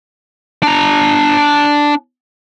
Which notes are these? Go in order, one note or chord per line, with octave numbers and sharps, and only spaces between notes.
D4 A#5